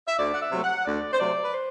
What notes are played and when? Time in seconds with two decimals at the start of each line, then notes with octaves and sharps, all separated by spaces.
0.08 E5
0.18 D2 D5
0.34 F#5
0.40 E5
0.51 C3 F#3 A3
0.63 F#5
0.85 D2 D5
1.12 C5
1.19 C3 F#3 A3 D5
1.43 B4
1.53 C5